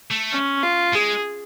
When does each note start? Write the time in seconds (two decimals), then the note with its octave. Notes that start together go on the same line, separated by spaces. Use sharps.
0.11 A3
0.32 C#4
0.63 F4
0.94 G#3 G#4